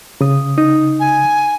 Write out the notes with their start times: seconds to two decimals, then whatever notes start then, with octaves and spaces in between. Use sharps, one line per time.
0.21 C#3 D#6
0.58 D#4
1.00 G#5